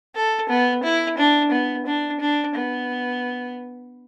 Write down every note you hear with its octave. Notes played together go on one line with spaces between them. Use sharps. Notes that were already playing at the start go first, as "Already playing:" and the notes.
A4
B3
E4
D4
B3
D4
D4
B3